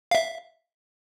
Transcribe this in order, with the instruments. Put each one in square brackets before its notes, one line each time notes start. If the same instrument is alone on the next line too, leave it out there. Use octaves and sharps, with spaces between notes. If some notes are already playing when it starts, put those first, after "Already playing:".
[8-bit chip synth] E5 F5